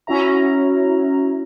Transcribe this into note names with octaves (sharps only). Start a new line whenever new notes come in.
C#4 E4 F#4 E5 A#5